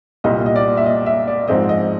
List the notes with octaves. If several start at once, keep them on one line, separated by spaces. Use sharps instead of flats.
C2 A#2 G3 D#5
D#5
D5
E5
D#5
E5
D5
G#2 F3 G#3 C4 D#5
D#5